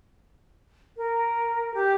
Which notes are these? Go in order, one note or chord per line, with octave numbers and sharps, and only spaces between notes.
A#4
G4